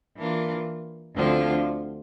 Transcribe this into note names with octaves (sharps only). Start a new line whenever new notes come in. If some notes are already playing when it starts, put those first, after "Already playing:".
E3 A#3 D4 F4
D2 D3 F3 C4 F4